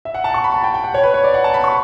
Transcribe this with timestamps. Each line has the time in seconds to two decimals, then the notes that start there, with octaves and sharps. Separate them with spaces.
0.05 E5
0.14 F#5
0.24 A5
0.34 C#6
0.44 B5
0.54 A5
0.64 G5
0.74 G5
0.84 F#5
0.94 C#5
1.04 B4
1.14 C#5
1.24 D5
1.34 F#5
1.44 A5
1.54 B5
1.64 C#6